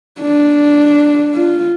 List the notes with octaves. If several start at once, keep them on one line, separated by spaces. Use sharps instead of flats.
D4
F4